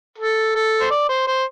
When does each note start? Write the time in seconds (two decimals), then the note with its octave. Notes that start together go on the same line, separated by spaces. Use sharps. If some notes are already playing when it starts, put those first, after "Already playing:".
0.18 A4
0.55 A4
0.80 C5
0.91 D5
1.09 C5
1.27 C5